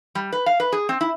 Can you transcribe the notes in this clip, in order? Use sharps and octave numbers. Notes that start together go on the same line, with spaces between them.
G3
B4
F5
B4
G#4
C4
E4